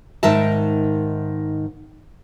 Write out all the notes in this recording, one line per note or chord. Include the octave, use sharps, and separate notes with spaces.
G#2 D#3 A#4 E5 A5